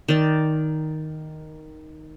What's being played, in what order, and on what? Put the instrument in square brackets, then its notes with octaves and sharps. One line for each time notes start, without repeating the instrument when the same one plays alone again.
[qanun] D#3 D5